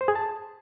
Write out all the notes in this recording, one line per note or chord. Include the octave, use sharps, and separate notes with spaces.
C5
G#4
A5